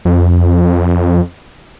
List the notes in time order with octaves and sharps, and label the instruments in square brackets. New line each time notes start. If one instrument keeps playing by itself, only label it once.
[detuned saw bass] F2